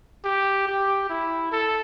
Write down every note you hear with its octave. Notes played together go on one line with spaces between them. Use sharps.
G4
G4
E4
A4